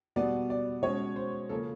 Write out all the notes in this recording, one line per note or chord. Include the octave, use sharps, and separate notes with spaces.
B2 G3 B3 D5
D5
B2 G#3 C#4 C#5
C5
C#3 F3 A#3 C#4 A4